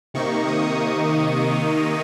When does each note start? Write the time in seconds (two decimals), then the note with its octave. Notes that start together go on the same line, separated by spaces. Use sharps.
0.14 C3 D#3 A#3 D#4 C#6
0.47 D#6